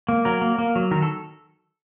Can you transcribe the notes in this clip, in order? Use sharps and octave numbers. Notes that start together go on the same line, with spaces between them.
A#3
F#3 A#4
A#3
A#3
F#3
D#3 A#4
A4